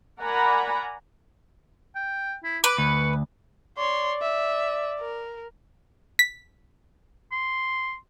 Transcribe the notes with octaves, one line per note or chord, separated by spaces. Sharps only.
A#4 D5 F#5 G#5 A#5 B5
G5
E4
B4 D6
D2 C#6
C#5 D5 C6
E5
A#4
B6
C6